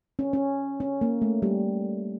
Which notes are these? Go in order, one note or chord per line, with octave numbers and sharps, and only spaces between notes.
C#4
C#4
C#4
A#3
A3
G3